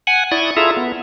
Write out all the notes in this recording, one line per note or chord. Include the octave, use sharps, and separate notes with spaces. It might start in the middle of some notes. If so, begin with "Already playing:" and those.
F#5 G#5
E4 D5 C#6 D#6
E4 F4 G#4 A4 E5 A#5
B3